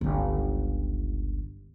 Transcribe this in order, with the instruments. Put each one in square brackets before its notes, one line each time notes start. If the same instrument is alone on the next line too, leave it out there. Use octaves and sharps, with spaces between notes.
[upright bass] G1 C#2